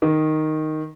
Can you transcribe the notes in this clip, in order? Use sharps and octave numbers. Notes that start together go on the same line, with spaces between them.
D#3